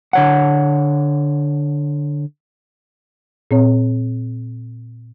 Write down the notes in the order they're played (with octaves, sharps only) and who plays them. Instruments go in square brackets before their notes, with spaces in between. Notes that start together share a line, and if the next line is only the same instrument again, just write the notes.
[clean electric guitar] D3 C#5 F#5
[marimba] A#2 C4 C#5